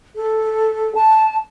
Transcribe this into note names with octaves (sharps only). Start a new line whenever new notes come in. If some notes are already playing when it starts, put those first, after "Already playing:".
A4
A5